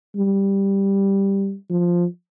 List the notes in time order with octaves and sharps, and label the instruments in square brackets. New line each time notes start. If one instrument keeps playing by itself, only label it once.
[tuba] G3
F3